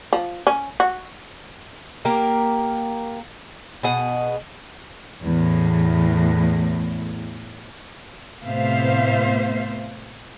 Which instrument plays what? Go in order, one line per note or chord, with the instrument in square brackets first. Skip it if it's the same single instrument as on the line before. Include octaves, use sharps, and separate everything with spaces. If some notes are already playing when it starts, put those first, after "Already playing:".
[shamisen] F3
C#4
F#4
[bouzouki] A#3 G4 A#4
B2 G#4 F#5
[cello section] E2 A2
A2 C3 B3 C5 E5 F5